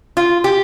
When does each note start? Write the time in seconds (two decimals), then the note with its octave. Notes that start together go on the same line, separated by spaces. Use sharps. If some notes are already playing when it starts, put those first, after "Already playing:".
0.17 F4
0.44 G4